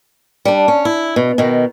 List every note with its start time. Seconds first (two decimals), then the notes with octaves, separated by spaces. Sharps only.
0.45 G3 D4
0.68 C#4
0.85 E4
1.16 B2
1.38 B2 D#3